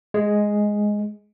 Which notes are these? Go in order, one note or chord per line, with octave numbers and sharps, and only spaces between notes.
G#3